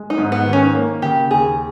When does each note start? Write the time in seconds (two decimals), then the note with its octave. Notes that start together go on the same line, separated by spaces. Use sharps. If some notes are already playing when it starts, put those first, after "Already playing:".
Already playing: G#3
0.10 D#4
0.18 G#2
0.32 B3
0.46 D#3
0.53 C#4
0.75 A#3
1.02 C#3 G4
1.31 D#2 G#4